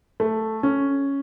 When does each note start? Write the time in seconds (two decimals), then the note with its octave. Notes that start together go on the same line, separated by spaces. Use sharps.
0.20 A3
0.63 C#4